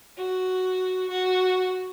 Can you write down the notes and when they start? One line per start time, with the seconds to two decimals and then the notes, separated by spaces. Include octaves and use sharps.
0.17 F#4
1.09 F#4